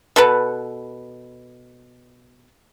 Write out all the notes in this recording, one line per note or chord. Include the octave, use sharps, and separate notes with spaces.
B2 A4 B4